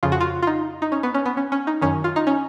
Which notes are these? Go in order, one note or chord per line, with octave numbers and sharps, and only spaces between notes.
F2 C#3 F4
F#4
F4
F4
D#4
D#4
C#4
B3
C#4
B3
C#4
C#4
D#4
F#2 D#3 C#4
F4
D#4
C#4